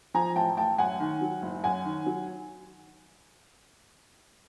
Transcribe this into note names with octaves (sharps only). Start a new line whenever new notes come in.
F3 G#5 A#5
A1 G5 A5
A1 G5 A5
F#2 F#5 G#5
D#3
F#3
F#1
F#2 F#5 G#5
D#3
F#3